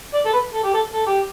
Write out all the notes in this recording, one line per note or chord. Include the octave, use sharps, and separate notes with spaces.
D5
A4
B4
A4
G4
A4
A4
G4